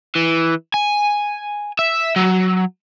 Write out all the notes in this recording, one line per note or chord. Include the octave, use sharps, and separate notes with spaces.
E3
G#5
E5
F#3